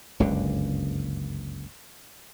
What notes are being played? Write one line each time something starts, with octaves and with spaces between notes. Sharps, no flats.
F#1 C#2 G2 D3